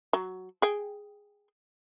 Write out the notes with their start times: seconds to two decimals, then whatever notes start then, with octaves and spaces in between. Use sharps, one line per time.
0.13 F#3
0.62 G#4 G5